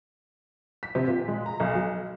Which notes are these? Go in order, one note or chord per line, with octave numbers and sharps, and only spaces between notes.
B6
C3
A#2
G#3
A#5
B1
F#3